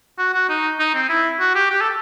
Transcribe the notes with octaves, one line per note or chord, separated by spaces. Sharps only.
F#4
F#4
D#4
D#4
C4
E4
F#4
G4
G4
A4